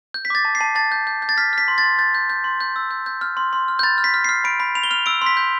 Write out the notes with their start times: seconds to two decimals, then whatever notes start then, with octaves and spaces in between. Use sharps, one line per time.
0.14 G6
0.25 B6
0.30 D6 A6
0.45 A5
0.55 C7
0.61 A5
0.75 A5 A6
0.92 G6
1.07 G6
1.22 G6
1.29 A6
1.38 F6 B6
1.53 F6 B6
1.68 C6
1.78 A6
1.83 C6
1.99 G6 A6
2.15 G6
2.30 G6
2.44 C6
2.61 G6
2.76 E6
2.91 G6
3.06 G6
3.21 F6
3.37 C6
3.53 C6
3.68 F6
3.79 G6
3.83 B5 A6
3.98 F6
4.04 B6
4.14 F6
4.24 F6 C7
4.44 B5 D7
4.60 B5
4.75 B5 F7
4.83 G7
4.91 F6 F7
5.06 E6 D7
5.22 C6 B6
5.37 G6